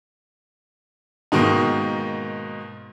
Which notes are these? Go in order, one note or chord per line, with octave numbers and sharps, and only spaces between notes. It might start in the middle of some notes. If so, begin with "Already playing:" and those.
G#2 B2 D#3 A#3